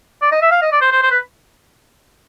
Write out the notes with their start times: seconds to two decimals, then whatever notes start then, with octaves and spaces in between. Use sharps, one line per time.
0.22 D5
0.32 D#5
0.42 E5
0.51 F5
0.62 D#5
0.72 D5
0.81 C5
0.92 C5
1.02 C5
1.11 B4